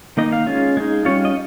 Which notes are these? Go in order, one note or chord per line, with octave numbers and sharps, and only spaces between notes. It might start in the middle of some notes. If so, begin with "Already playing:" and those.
D#3 A#3 D#4 D#5
F5
G#3 C#4 F4
G#3 D#4
G3 C#4 F4 C#5
D#5